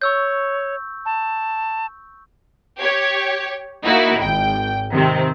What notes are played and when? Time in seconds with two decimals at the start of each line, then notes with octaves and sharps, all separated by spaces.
0.02 C#5 C#6 E6 G6
1.05 A5
2.80 G4 C#5
3.84 A#3 D#4 E4 F#4
4.18 G#1 G5
4.93 C3 D#3 C4